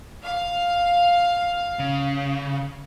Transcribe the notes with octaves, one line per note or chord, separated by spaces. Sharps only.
F5
C#3